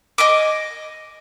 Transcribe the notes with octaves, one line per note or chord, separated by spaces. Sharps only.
D#5 G#5 D6